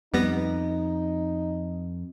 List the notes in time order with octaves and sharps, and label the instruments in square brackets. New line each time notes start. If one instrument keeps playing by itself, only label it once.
[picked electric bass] F2 [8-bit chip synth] G3 B3 A#6 [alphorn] D#4